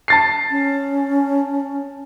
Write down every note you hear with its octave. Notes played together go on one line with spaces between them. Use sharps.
A5 A6 C7
C#4